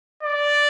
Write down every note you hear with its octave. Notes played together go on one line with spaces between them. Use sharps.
D5